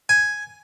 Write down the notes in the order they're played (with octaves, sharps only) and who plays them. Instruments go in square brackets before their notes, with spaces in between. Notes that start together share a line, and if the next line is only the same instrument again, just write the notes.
[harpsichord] G#5